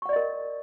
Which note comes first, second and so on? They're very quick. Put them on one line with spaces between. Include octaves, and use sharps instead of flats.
C#6 F#5 D5 D#5 A#4